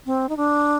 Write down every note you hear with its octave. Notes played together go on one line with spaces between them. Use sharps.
C4
D#4
D4